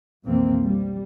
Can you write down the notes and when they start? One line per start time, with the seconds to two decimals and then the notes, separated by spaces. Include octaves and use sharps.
0.25 B1 F2 E3 A#3 C4
0.63 G3